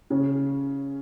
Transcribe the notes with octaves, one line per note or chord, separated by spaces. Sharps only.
C#3 C#4